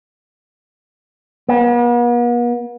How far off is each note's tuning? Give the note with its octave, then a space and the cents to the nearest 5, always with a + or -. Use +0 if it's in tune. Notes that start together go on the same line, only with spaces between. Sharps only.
B3 -45